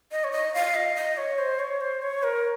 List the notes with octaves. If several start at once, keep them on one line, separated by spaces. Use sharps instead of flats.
D#5
C#5
D#5
F5
D#5
D#5
C#5
C5
C#5
C5
C#5
A#4